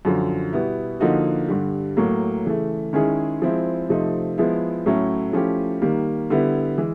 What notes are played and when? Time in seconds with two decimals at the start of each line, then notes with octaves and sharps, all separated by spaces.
0.05 F#2 D3 F3
0.53 B2 G3 B3 E4
1.00 D3 F3 A#3 D#4 F#4
1.48 G2 D3 G3
1.97 A2 F#3 A#3
2.45 C#3 E3 A3
2.93 D#3 G#3 C#4 E4 G#4
3.42 F3 G#3 C4 E4
3.89 C3 F3 A3 C4 D#4
4.38 F3 G#3 B3 E4
4.86 A2 F#3 A3 C#4 E4
5.33 F3 A3 C#4 E4 G4
5.82 D#3 G3 A#3
6.30 D3 G3 B3 E4
6.78 E3 G#3